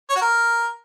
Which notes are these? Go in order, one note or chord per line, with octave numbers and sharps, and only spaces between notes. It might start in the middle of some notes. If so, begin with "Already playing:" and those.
C#5
F#4
A#4